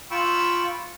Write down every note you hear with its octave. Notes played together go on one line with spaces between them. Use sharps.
F4 G5 B5 C#6 E6